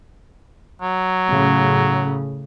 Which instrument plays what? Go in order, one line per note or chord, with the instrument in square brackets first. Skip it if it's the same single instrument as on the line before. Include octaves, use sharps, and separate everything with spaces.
[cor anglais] F#3
[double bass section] A2 C#3